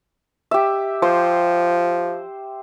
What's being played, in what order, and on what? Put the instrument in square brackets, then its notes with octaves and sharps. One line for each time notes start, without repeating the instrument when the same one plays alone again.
[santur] G4 E5
[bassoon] F3 [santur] C5